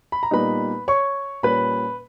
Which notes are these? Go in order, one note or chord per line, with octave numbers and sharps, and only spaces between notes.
B5
A#5
A#2 G3 B3 D#4 B4 B5
C#5 C#6
A#2 G3 C#4 B4 B5